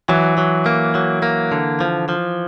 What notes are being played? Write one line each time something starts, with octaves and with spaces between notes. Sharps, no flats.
E3 F#3
F#3
A#3
F#3
A#3
D3
F3
F3